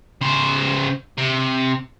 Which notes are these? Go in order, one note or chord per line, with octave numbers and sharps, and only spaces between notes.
C#3 C5
C3